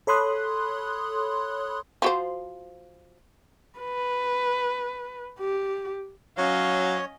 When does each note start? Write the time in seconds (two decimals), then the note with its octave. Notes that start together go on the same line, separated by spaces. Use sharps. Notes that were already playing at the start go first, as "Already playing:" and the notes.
0.07 A4 C#5 B5 C6 D#6 F#6
2.02 F3 F#4 C5
3.79 B4
5.40 G4
6.38 F#3 C#4 C#5 D#5 F5